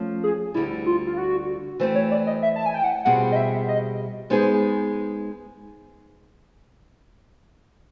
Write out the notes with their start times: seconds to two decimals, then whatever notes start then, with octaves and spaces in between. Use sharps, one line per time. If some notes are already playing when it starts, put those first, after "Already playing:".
Already playing: F3 A3 C#4
0.24 G#4
0.54 D2 D3 G3 E4
0.86 F4
1.07 F4
1.17 F#4
1.80 E3 A3 C4 C5
1.95 C#5
2.11 D5
2.27 D#5
2.42 E5
2.56 A5
2.66 G#5
2.74 G5
2.84 F#5
3.05 B2 G3 C4 F4 G#4 F#5
3.32 D#5
3.36 E5
3.68 D#5
4.30 G#3 B3 D#4 G#4 C5